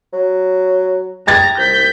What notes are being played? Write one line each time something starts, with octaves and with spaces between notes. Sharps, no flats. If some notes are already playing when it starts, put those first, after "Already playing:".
F#3
G5 A#5 G#6 A6
C2 G6 B6